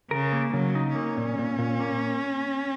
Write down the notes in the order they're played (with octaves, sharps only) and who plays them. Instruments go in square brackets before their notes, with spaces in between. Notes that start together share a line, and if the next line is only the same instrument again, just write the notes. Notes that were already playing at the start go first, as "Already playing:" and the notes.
[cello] C#3 [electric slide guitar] A#4
[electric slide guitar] A#3
[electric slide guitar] C#3 [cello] F#3
[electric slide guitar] D#4
[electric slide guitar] A#3 [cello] C#4
[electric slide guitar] A#2
A#2
A#2
A#3